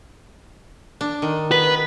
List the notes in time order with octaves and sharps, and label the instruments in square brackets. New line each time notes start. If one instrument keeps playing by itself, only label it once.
[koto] D4
D#3
[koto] B3 [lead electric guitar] B4